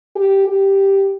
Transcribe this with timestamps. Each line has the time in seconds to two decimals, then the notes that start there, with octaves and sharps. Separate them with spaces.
0.15 G4
0.48 G4